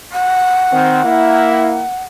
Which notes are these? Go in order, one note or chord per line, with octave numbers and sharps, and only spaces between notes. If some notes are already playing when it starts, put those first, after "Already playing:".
F#5
D#3 C4
A#3 E4